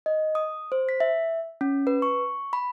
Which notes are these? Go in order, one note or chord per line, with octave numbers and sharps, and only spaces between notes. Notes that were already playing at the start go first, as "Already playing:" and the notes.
D#5
D#6
C5
B6
E5
C#4
B4
C#6
B5